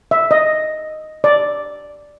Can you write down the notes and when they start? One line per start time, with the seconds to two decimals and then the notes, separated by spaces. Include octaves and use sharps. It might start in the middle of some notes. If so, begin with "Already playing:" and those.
0.11 E5
0.31 D#5
1.24 D5